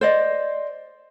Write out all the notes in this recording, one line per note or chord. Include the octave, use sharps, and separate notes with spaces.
C5 D5 D#5